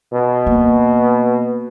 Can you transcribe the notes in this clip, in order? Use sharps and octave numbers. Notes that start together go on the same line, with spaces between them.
B2
A#3